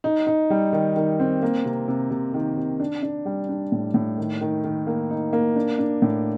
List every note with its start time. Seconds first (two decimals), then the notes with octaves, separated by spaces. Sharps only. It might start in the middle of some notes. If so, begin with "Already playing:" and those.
0.04 D#4
0.27 D#4
0.50 G3
0.72 D#3
0.96 D#3
1.20 C4
1.43 A#3
1.65 C3
1.88 C3
2.11 C3
2.34 D#3
2.57 C3
2.80 D4
3.03 D4
3.25 G3
3.49 D4
3.72 A2
3.94 A2
4.18 D#3
4.41 D#3
4.64 D#3
4.87 A#3
5.10 D#4
5.33 A#3
5.56 D4
5.79 D4
6.02 A2